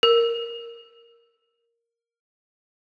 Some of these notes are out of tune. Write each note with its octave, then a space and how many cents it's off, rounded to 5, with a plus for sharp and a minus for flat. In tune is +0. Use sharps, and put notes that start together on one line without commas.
A#4 -5